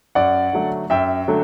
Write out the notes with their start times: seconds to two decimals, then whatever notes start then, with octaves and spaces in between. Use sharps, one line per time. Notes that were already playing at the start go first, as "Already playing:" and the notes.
0.15 F#2 D5 F#5
0.53 D3 F#3 A3
0.90 F#2 E5 G5
1.28 D3 F#3 A3